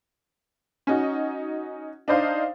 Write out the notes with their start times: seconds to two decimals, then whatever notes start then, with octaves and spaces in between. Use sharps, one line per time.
0.87 C#4 D#4 F#4
2.08 D4 D#4 C5 F5